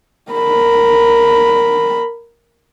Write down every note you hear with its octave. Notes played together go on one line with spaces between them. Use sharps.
A#4 B5